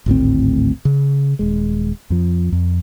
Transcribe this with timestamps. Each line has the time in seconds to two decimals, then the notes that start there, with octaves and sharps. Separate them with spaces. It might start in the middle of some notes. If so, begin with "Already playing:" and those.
0.06 G#1 D2 A2 C4
0.85 C#3
1.39 D#1 G#3
2.10 F2 F3
2.52 F2